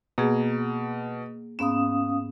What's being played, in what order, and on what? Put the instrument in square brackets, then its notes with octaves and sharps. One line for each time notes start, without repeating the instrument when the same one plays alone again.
[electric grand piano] B2 [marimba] A#3 G#4
[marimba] G#2 B3 A#5 [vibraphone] C#4 F5 D#6 [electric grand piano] E7